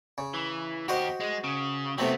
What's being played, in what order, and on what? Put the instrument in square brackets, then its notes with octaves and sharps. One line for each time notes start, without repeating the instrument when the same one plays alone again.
[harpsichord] C#3
[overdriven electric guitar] E3
[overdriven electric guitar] D#2 G4 [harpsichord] F#4 C5 D#5
[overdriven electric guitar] G#3
C#3
[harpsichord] C3 A3 C4 [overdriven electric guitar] F#3 B3